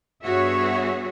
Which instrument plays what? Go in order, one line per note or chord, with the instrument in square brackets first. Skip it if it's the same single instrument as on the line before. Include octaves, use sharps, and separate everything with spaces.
[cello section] G2 B3 F#4 G#4 C#5 E5